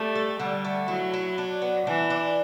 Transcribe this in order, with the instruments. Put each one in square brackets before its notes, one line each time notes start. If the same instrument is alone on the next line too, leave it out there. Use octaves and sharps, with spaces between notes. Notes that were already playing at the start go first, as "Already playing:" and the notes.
Already playing: [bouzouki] G3 [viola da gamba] A3
[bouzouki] A4
[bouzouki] D3 [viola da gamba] G3
[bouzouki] A3
[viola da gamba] F#3 [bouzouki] E4
[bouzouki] E4
D4
B3
[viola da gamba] E3 [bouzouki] D4
[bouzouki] D4